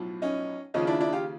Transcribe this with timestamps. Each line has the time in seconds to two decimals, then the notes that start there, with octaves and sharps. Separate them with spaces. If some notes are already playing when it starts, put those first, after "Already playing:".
Already playing: B1 A2 F3
0.22 C#4 D#4
0.74 D#2 C#3 F3 C#4 D#4
0.87 D4 E4
1.00 D4 E4
1.13 F4 G4